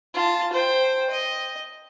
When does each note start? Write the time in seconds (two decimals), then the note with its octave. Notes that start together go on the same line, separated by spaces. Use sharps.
0.14 F4 A5
0.53 C5 G5
1.10 D#5